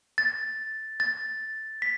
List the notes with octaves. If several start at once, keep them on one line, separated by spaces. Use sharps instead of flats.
A6
A6
B6